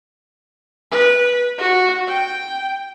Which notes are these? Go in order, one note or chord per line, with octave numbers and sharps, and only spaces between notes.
B4
F#4
G5